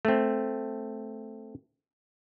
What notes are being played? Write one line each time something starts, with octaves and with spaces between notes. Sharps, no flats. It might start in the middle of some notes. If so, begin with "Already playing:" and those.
A3 C4